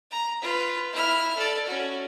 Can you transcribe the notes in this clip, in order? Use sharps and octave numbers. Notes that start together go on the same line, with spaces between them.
A#5
F4 B4
E4 F6
A4 D5
C#4 F#4